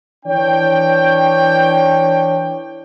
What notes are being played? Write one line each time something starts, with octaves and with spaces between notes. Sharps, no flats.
E3 D4 C#5 G5